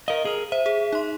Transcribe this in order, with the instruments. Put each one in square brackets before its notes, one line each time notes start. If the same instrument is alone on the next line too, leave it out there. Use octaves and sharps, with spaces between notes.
[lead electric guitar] A#4 D#5 [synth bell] F5
[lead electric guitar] G#4 A#4 [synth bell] D#7
[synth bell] C5 [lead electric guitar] E5
[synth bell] G#4
D#4 C6